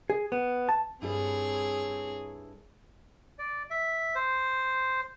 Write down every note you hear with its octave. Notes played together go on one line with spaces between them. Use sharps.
G#4
B3
A5
G2 C4 E4 G#4 A4 C#5
D5
E5
C5